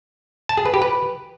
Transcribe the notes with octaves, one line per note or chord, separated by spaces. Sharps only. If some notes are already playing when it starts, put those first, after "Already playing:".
A5
G#4
B4
G4
B4